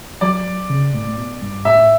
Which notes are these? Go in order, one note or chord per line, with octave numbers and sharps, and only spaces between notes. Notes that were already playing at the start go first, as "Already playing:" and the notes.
F#3 D5
C#3
A2
A2
B2
G2
A2 E5